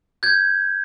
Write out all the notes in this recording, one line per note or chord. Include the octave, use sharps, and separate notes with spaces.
G6 G#6